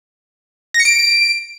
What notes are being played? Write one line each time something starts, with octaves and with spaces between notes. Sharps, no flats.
A#6
C#7
D7